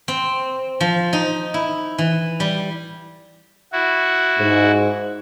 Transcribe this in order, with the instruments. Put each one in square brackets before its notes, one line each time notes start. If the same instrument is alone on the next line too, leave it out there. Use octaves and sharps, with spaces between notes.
[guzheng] C4
F3
D#4
E4
E3
G3
[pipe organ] E4 F#4
[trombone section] G#2